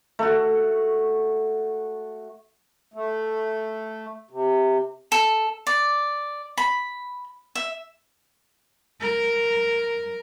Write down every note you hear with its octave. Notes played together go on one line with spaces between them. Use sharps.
A3 F#4
A3
C3
A4
D5
B5
E5
A#4